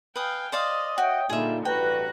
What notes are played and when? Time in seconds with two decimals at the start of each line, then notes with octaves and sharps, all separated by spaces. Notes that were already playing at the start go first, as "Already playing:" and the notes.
0.16 B4 F5 G5 G#5 D#6
0.52 C5 D5 D#5 F5
0.98 F#4 C#5 E5 G5
1.30 A#2 D3 G3 D4 D#4 F4 G#4 E5
1.65 A1 G2 F#4 B4 G5 A#5 F#6